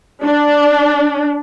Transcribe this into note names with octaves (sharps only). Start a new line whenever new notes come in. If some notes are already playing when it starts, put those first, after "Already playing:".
D4